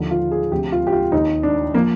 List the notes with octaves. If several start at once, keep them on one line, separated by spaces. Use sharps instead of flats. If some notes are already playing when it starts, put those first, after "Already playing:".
Already playing: D#2 D3 F3
F4
G#4
D2 C3 F3 G4
F4
G4
F4
D#2 D#3 D#4
D4
F3 A#3